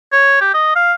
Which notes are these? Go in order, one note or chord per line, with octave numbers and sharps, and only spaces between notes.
C#5
G4
D#5
F5